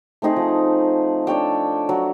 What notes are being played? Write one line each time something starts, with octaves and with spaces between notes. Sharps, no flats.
A3 C4 D#4 G#4
F3
D4 A4 C#5 G5
F#3